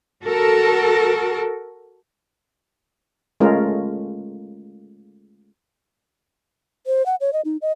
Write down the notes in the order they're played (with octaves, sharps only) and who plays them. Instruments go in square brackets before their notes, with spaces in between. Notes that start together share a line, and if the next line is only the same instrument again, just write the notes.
[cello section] F#4 A4 A#4
[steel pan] G#3 A3 C#4 F4 A#4
[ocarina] C5
F#5
C#5
D#5
D#4
D#5